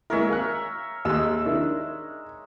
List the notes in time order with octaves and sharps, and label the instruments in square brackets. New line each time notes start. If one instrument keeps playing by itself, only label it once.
[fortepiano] G#3 A#3 E4 [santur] A#4 C#5 E5
[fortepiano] F5 G#5 F#6
[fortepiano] D#2 [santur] G#3 E6
[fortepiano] D#3 D4 E4